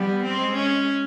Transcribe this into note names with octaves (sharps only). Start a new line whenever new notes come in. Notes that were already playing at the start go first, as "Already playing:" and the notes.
Already playing: G3 B3
C4
G#3
C#4